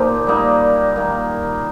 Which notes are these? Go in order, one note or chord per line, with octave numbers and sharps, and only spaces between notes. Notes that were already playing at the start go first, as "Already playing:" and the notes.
Already playing: A#2 F3 D#4 G4
G3 A#3 D#4
D#3 A#3